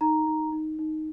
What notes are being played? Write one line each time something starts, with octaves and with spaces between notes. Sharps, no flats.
D#4 A#5
D#4
D#4
D#4